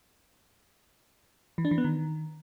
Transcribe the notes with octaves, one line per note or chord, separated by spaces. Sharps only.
E3
D4
E3
B3
D#3